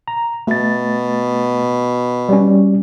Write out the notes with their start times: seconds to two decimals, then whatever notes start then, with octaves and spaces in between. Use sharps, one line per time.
0.08 A#5
0.47 B2 A3 A6
2.29 G3 C#4